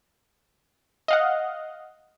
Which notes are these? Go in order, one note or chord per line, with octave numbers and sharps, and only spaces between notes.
D#5 F5 F#5